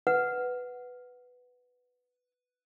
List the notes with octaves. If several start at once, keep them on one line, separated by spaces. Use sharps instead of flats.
B4 F#5